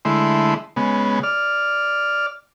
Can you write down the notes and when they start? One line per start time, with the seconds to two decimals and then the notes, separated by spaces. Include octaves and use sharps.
0.05 D3 G#3 A3 E4 C6
0.76 C#3 G#3 B3
1.23 D5 F6